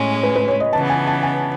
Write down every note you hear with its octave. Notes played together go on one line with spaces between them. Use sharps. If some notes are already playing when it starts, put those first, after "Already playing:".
Already playing: A2 G#3 C#4
B4
B4
C#5
D#5
C#3 E3 B3 A5
G#5
A5
G#5